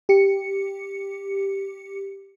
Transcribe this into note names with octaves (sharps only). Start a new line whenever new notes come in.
G4 C#7